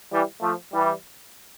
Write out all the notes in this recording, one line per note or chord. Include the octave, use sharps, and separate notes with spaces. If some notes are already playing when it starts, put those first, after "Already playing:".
E3 G3
F3 A3
E3 G3